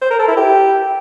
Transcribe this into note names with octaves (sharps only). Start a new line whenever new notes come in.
C5
A#4
A4
E4
G4